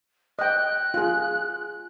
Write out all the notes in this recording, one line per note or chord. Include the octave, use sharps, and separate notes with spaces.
D#5 G5 F#6
F4 G#4